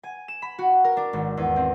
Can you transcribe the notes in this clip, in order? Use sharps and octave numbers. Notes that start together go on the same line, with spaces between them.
G#5
E7
B5
F#4
A#4
D4
G#1
E2
C4